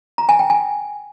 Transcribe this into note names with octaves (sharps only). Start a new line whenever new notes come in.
A#5
G#5
G5
G#5